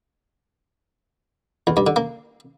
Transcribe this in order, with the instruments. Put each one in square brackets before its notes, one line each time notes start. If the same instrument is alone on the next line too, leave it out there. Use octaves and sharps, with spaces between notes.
[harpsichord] E2
G2
D3
A#3